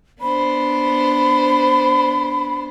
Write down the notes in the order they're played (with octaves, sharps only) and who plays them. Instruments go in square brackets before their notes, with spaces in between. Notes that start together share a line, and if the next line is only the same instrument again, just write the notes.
[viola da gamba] B3 D4 C5 [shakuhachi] B5